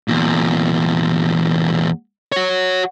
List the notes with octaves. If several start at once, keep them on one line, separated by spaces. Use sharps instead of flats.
E2 A#2
F#4 C#5